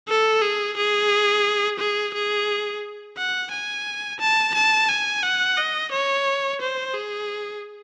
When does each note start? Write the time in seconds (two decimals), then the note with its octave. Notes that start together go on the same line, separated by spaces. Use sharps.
0.08 A4
0.42 G#4
0.77 G#4
1.79 G#4
2.14 G#4
3.17 F#5
3.52 G#5
4.20 A5
4.54 A5
4.89 G#5
5.23 F#5
5.57 D#5
5.92 C#5
6.61 C5
6.94 G#4